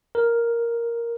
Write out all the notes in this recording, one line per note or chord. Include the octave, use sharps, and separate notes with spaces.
A#4